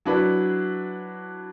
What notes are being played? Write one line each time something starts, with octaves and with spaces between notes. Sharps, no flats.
F#3 D4 E4 B4